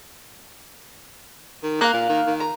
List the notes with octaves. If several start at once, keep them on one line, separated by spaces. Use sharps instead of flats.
D#3
A#3 F5 F#6
A#2
D#3
D#3
A#5